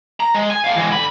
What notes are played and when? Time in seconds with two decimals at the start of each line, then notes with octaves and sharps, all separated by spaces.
0.20 A#5
0.35 G#3
0.50 G#5
0.64 A2 F5
0.76 E3 G#3
0.92 D3 B5